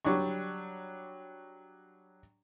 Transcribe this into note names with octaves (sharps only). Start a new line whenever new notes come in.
F#3 G3 D4 C#6